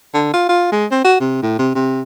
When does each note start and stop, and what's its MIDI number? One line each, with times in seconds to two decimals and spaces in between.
0.14 0.29 50
0.33 0.47 65
0.49 0.67 65
0.72 0.85 56
0.91 1.01 60
1.04 1.18 66
1.20 1.38 48
1.42 1.56 45
1.59 1.71 48
1.75 2.01 48